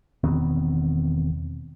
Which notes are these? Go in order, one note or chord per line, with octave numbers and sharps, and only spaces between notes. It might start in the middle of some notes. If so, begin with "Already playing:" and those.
E1 D#3 B3 C4